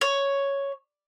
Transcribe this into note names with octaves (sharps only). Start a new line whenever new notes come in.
C#5